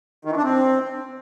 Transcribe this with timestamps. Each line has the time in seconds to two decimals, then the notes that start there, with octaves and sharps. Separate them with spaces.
0.25 D#3
0.31 E3
0.37 D4
0.43 C4